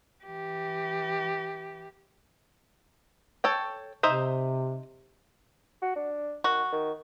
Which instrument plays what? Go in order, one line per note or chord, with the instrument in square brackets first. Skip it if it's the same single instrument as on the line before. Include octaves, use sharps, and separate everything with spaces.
[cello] E3 G4
[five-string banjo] A4 C#5 G5
[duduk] C3 [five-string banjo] D#4 C5 E5
[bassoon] F#4
D4
[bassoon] D#3 [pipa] F#4
[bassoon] D#3